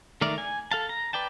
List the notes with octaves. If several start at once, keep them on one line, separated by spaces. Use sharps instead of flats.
D#3 A3 A#4 D5
G#5
A4 F5 A5
A#5
B4 D5 G5 A5